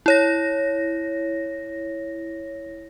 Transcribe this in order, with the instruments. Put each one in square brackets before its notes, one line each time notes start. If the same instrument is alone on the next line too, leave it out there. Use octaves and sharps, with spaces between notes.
[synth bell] E4 C#5 A#6